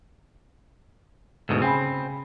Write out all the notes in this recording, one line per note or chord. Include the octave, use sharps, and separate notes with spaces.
D2 G#2 B2
C#3 C4 G#5 B5